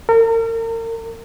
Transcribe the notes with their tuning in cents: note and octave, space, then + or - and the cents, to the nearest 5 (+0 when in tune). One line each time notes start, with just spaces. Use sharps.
A#4 -40